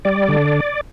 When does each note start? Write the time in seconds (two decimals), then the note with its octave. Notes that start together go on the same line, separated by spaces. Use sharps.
0.05 G3 D5
0.29 D3